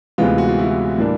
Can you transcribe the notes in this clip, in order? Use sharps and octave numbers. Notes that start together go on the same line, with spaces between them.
D2 C3 E3 G#3 B3 F4
F#4
F4
E4
A2 E3 G3 A#3 D4